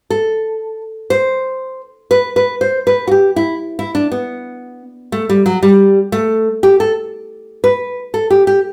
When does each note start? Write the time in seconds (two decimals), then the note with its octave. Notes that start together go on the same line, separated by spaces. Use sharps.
0.10 A4
1.10 C5
2.11 B4
2.36 B4
2.61 C5
2.87 B4
3.07 F#4
3.11 G4
3.36 E4
3.79 E4
3.95 D4
4.12 B3
5.12 A3
5.29 G3
5.46 F#3
5.63 G3
6.12 A3
6.63 G4
6.80 A4
7.64 B4
8.14 A4
8.30 G4
8.47 G4